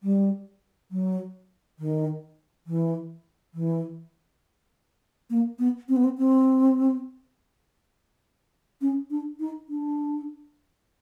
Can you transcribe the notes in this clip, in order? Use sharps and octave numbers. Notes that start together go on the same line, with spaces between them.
G3
F#3
D#3
E3
E3
A#3
B3
C4
B3
C4
C4
C#4
D4
D#4
D4